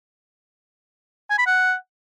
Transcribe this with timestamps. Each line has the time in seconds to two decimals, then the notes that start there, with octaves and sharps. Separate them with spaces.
1.30 G#5
1.38 B5
1.46 F#5